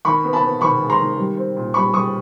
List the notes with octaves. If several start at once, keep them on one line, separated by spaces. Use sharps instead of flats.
D#3 B5 C#6
B3
A5 B5
B3
D#3 B5 C#6
G#3
A#5 C6
D#3
G3
C4
A#2
G3 B5 C#6
G3 C#6 D#6